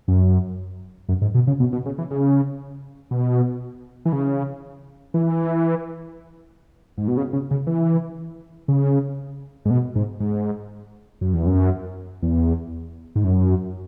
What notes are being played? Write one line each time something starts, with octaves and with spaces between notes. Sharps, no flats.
F#2
F#2
G#2
B2
C#3
B2
B2
C#3
E3
C#3
B2
E3
C#3
E3
G#2
B2
C#3
C#3
C#3
E3
C#3
G#2
B2
G#2
G#2
F#2
E2
F#2
E2
G#2
F#2